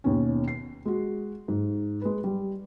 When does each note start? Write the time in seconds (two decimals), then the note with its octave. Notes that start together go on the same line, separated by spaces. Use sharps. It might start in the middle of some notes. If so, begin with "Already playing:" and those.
0.04 D#2 B2 C#4
0.48 C7
0.85 G#3 F#4
1.48 G#2
2.01 G#3 B4
2.24 G3